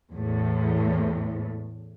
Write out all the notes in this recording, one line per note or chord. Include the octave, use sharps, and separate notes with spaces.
E2 A2